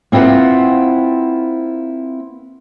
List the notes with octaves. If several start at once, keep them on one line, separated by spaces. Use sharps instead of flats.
A#3 C4 E4 F4 B4 F#5